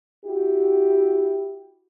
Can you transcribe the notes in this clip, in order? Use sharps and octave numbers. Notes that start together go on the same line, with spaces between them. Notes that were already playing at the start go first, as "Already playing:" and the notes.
E4 F#4 G4